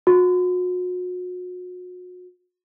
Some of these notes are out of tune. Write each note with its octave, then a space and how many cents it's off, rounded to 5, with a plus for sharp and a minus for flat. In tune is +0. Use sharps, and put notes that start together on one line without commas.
F#4 -40